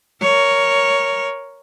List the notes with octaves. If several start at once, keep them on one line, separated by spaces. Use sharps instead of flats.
A#4 C#5